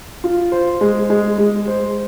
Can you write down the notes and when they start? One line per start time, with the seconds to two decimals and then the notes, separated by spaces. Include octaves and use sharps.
0.24 F4
0.52 C5
0.81 G#3
1.10 G#3
1.38 G#3
1.67 C5